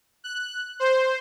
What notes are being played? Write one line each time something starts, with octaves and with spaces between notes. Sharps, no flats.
F#6
C5